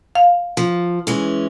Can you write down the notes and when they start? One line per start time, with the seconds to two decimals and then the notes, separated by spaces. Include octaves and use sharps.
0.15 F5
0.57 F3
1.07 E3 G#3 C#4